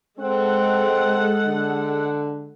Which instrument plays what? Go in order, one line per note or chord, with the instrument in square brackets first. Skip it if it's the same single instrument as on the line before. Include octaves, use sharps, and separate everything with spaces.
[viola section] G#3 A4 F#5 [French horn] C4
[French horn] D3